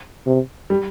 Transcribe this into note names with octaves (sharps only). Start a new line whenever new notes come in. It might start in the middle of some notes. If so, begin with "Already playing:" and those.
C3
G3